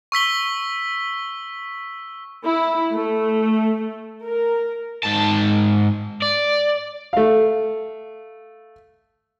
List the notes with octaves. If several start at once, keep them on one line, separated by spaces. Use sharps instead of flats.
C#6 E6 B6 G7
E4
A3
A#4
G#2 A5
D5
A3 F5